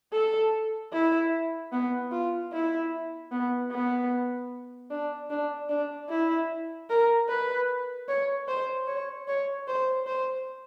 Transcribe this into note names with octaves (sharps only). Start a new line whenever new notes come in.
A4
E4
B3
F4
E4
B3
B3
D4
D4
D4
E4
A#4
B4
C#5
C5
C#5
C#5
C5
C5